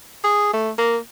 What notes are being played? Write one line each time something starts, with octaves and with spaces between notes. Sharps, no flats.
G#4
A3
A#3